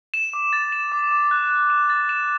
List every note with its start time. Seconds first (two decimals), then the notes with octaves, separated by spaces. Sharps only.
0.14 E7
0.33 D6
0.53 A6
0.72 E7
0.92 D6
1.11 D6
1.31 F#6
1.51 F#6
1.70 E7
1.90 A6
2.09 E7